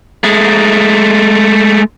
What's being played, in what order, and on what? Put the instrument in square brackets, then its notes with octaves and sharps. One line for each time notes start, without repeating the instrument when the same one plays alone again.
[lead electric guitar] G#3 A3